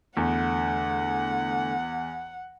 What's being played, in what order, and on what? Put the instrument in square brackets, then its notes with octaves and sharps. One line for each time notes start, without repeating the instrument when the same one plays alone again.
[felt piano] E2 [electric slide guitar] D3 A3 [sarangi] F#5